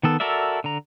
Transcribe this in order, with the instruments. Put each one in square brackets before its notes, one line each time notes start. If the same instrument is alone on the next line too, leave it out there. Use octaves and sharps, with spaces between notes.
[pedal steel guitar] D#3 B3 A4
F#4 A4 A#4 D5 E5
D3 A#5